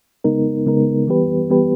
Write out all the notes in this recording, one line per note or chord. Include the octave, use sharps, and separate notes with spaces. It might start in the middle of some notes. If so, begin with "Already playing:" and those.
C#3 G#3 B3 D#4 A#4
C#3 G#3 B3 D#4 A#4
E3 G3 B3 G4 B4
E3 G3 B3 G4 B4